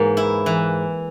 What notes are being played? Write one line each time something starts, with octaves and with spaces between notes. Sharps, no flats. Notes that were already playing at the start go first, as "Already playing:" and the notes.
Already playing: G#2 E3 A#3
E4
E3